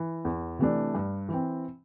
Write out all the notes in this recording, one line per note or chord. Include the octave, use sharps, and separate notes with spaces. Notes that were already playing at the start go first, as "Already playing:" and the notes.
Already playing: E3
E2
C3 E3 A3 D4
G2
E3
C4